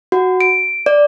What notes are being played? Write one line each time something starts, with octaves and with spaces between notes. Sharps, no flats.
F#4
D7
D5